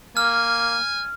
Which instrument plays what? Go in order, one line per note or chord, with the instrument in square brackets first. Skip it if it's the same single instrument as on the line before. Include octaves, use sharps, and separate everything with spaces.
[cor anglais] A#3 [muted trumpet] G#5 [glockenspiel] F6